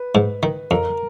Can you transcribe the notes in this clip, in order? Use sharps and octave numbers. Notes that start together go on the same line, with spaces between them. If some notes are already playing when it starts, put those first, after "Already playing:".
Already playing: B4
G#2
D#3
F2 A#4